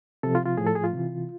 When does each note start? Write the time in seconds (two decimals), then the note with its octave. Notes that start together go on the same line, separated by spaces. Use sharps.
0.23 C3 F3 A4
0.35 F4
0.46 F4
0.57 A2 F3 G#4
0.67 A4
0.75 G#4
0.84 F4
0.93 C3 E3